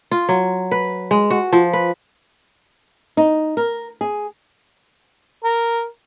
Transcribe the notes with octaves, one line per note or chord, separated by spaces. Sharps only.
F4
F#3
B4
G#3
F#4
F3
B4
D#4
A#4
G#4
A#4